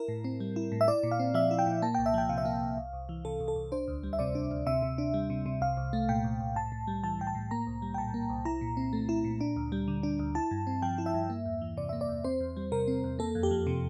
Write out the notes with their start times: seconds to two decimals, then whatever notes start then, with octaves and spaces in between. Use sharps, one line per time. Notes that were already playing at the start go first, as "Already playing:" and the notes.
Already playing: E4 A#4
0.08 A2
0.24 C4
0.40 G3
0.56 E4
0.72 A2
0.81 E5
0.88 E4 D5
1.03 A#2
1.11 F5
1.19 C4
1.34 F3 E5
1.51 E4
1.59 G5
1.67 A#2
1.82 A#3 A5
1.95 C2 G5
2.06 E5
2.14 F3 G5
2.29 C3 F5
2.38 E5
2.45 A#3 F5
2.61 C2
2.77 C2
2.93 C2
3.09 E3
3.25 C3 A4
3.40 C2
3.48 A4
3.56 C2
3.72 D4 C5
3.88 D2
4.03 G3
4.13 E5
4.19 C3 D5
4.35 D4
4.51 D2
4.66 C3 E5
4.82 C3
4.98 D4
5.14 G3
5.30 C3
5.46 C3
5.61 C2 F5
5.77 C2
5.93 A3
6.09 A#2 G5
6.24 C2
6.40 C2
6.56 A2 A5
6.72 A2
6.87 G3
7.03 E3 A5
7.19 A2 G5
7.27 A5
7.35 A2
7.51 A#3 A#5
7.67 C2
7.82 G3
7.94 G5
7.98 A#2 A5
8.14 A#3
8.30 C2
8.45 E4 A#5
8.61 A#2
8.77 C4
8.93 A3
9.09 E4
9.24 A#2
9.41 D4
9.56 D2
9.72 G3
9.88 D3
10.03 D4
10.19 D2
10.35 E4 A5
10.51 G2
10.67 C4
10.82 F3 G5
10.98 E4
11.06 E5
11.14 G2
11.30 A#3
11.46 E2
11.62 E3
11.77 C3 D5
11.89 A#3 E5
12.01 D5
12.09 E2
12.24 C4 C5
12.41 E2
12.57 G3
12.72 C3 A#4
12.88 C4
13.04 E2
13.19 A#3 A4
13.35 F2
13.43 G4
13.51 F3
13.67 C3